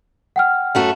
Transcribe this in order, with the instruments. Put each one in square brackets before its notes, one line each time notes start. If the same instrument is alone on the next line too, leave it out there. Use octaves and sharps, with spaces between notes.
[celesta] F#5 G5 F6
[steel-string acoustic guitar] F#2 A3 F#4